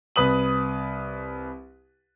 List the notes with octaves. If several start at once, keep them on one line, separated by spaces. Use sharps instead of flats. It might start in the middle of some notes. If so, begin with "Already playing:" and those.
C2 B4 D#6 F#7